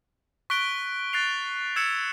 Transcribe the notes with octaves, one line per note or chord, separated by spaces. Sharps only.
C#6 F#6 B6 D7 G7
F#6 A6 C7 F7
E6 G#6 C#7 E7